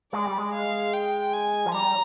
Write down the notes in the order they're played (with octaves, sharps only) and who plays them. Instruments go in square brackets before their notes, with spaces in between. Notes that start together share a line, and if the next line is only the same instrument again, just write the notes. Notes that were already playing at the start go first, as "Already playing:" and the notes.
[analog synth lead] G#3 [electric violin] D5
[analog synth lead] G3
G#3
[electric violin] F5
G5
G#5
[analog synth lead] F3
[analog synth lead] G3 [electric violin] A#5